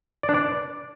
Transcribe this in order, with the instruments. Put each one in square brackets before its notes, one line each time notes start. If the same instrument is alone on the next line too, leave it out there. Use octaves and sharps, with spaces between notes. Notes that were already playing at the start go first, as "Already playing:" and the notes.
[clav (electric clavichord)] D5
D4
D5